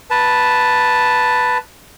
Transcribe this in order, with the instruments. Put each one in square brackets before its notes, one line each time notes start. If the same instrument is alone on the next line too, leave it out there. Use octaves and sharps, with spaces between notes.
[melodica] B4 A5